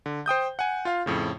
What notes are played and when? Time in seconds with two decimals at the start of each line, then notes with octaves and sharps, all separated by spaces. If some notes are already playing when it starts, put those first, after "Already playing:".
0.06 D3
0.26 C5 G5 D#6 G6
0.59 F#5 G#5
0.85 F4 F5
1.06 F2 A2 C#3